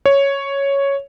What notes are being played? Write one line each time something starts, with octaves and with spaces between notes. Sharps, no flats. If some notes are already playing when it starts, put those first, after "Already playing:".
C#5